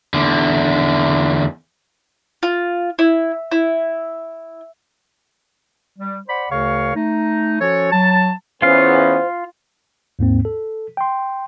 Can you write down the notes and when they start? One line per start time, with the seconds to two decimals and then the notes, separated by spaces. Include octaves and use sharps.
0.14 E2 D3
2.43 F4
2.99 E4
3.52 E4
5.99 G3
6.29 C5 D5 F#5 B5
6.51 D2 C#3 A#4 C#5 F5 C#6
6.95 A3 D#4
7.61 F3 C#4 F#4 A4 C#5
7.92 F#3 A5
8.62 E2 B3 C#4 F4 C5 F5
10.19 D#2 G#2 A#3 C4
10.45 A4
10.97 G5 C6